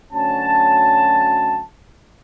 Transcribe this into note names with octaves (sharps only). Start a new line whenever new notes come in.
D2 F#3 C#4 A5